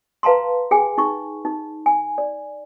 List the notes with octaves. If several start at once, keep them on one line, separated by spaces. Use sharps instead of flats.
B4 F5 A5 A#5 C6
G#4 G5 G#5
D#4 C#6
D#4
G#5
D5